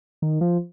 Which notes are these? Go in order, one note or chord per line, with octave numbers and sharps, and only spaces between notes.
D#3
F3